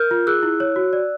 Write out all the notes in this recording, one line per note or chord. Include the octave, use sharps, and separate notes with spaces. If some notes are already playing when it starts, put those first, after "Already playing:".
Already playing: A#4 F6 G6
F4
G#4 E6 F#6
E4
C#5
F#4
D5